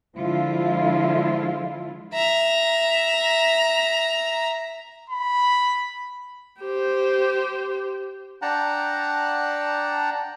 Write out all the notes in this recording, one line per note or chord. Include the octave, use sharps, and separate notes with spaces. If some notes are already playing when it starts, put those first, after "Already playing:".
D3 F3 G#3 E4 F4
E5 A#5
B5
G4 C5
D4 F#5 G5 A5 A#5